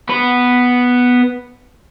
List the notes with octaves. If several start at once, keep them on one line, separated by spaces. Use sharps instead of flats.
B3 B5